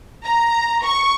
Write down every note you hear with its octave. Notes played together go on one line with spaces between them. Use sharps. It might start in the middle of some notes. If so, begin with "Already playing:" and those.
A#5
C#6